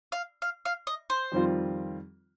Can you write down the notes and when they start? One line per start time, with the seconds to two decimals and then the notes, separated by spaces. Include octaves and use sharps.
0.12 F5
0.42 F5
0.65 F5
0.87 D#5
1.10 C5
1.32 F2 D#3 G3 C4 F4